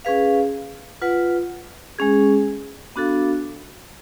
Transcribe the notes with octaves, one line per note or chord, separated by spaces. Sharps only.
C#4 G#4 B4 F5
F4 B4 F#5
G#3 C#4 G#4
B3 D4 F#4 A4 F5